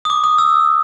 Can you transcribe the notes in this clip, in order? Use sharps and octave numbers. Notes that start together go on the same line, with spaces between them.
D#6
D6
D#6
E6